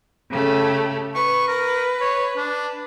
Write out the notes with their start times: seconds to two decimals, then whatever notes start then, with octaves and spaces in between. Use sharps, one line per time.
0.30 C#3 A3 G4
1.15 B4 C#6
1.48 A#4
2.01 C#5
2.37 D4